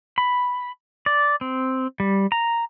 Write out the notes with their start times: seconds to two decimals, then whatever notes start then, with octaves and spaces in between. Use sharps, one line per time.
0.18 B5
1.06 D5
1.41 C4
2.00 G3
2.32 A#5